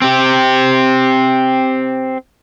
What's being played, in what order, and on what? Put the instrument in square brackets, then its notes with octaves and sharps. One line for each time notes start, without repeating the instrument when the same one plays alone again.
[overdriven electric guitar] C4 G4